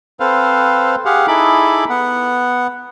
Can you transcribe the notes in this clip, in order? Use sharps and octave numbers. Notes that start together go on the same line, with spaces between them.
C4 A4 B4 C5 F5
G4 G#4 F5 F#5
D#4 E4 G#4 A4 B5 D6
B3 F#5